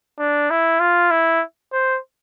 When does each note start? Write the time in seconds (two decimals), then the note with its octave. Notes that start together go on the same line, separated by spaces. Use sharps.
0.19 D4
0.50 E4
0.80 F4
1.11 E4
1.73 C5